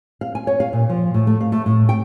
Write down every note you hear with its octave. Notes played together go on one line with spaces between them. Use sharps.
F5
G#5
C#5
F5
A#2
F3
A2
A3
F5
A3
A2
G5